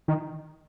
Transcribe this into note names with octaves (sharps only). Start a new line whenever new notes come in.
D#3